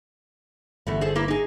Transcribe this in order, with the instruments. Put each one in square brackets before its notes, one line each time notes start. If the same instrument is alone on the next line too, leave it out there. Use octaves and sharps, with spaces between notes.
[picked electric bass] G1 [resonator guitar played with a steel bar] E3 A3 B3
[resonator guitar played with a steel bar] G#4 A4 C5
A#3 E4 B4
D#4 G#4